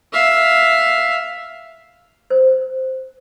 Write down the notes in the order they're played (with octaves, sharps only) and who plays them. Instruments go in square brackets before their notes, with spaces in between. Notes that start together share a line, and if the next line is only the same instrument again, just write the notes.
[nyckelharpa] E5 F5
[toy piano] C5